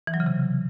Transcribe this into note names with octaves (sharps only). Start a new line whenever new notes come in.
E3
F#3
C#3
C3